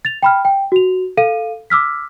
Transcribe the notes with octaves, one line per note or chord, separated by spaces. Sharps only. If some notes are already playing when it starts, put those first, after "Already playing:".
A6 F7
G5 B5 F6
G5
F#4 F7
A4 F5 D#7
D6 E6 F6 B6